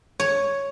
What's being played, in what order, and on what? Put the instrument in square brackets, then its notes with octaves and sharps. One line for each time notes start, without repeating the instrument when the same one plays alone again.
[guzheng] C#5